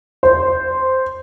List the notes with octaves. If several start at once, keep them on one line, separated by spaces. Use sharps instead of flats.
C5